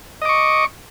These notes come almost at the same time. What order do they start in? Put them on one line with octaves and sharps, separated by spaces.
D#5 D6 C#6